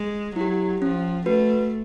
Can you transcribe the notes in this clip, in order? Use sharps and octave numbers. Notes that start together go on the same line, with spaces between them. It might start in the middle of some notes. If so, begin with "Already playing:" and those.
Already playing: G#3
F#3 E4 G4
F3 C#4
A3 F#4 B4